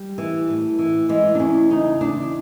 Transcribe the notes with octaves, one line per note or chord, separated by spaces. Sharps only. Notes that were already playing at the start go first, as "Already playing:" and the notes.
Already playing: G3
E3
A2
E3
E3 G#3
D4
E2 C#4
C#3 D#4
E2 D4